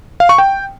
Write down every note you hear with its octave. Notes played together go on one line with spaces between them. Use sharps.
F5
C#6
G5